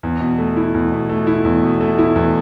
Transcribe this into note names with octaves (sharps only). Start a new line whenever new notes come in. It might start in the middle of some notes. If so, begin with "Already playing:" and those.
E2
B2
A3
E4
E2
B2
A3
E4
E2
B2
A3
E4
E2